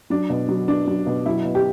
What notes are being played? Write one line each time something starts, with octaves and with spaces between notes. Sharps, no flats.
F#3 D4
B2
F#3
B2 D4
F#3
B2
F#3 E4
B2
G4